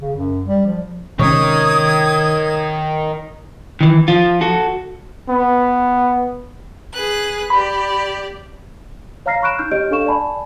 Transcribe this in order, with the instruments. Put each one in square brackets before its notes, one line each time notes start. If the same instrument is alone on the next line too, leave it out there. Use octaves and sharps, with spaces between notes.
[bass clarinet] C#3
F#2
G3
F3
[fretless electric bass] C3 G#3 C#4 [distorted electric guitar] D#3 [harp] C#5 [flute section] D#6 G#6
[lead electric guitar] D#3 E3
F3 F4
F#4 A4
[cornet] B3
[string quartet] G#4 B4 F#6
[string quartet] G4 D5 [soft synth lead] B5
[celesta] C#5 F5 A#5 F6 A#6 C7
B5 C#6 F6 F#6 D7 E7
D#4 F6 G6
G4 C#5 D#5 F6 G6 D7
D4 A4 F5 C#6 E7
D5 G#5 A5 B5